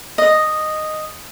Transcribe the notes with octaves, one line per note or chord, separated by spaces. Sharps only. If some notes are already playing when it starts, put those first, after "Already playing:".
D#5